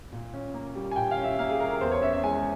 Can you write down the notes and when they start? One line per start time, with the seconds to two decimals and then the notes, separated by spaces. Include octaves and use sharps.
0.12 A#2
0.34 C#4
0.54 A#3
0.75 G3
0.91 G#5
0.96 A#2 G5
1.11 F5
1.18 C#4
1.24 E5
1.39 A#3 F5
1.49 G#4
1.60 G3 A#4
1.71 A#4
1.81 E2 C5
1.92 C#5
2.02 C#4 E5
2.13 E5
2.23 G#3 G#5